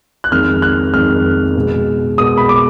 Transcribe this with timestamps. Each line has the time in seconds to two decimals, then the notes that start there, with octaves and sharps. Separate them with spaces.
0.24 F#6
0.32 F2 D#3 G#3 F6
0.62 F#6
0.94 F2 D#3 G#3 F6
1.56 B2 G#3
2.17 B2 G#3 D#6
2.38 B5
2.49 D6